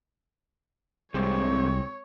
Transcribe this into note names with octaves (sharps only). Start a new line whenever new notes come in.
C2 G#2 C3 G3 G#3 C4 C#5